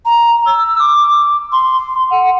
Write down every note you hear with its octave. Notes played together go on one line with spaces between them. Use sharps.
A#5
E6
D6
C6
F#5